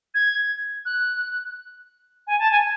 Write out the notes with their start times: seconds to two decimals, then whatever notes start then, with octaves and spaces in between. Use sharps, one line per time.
0.15 G#6
0.85 F#6
2.27 G#5
2.39 A5
2.51 G#5